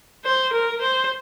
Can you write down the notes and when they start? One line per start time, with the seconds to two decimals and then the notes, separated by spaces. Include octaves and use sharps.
0.25 C5
0.53 A#4
0.81 C5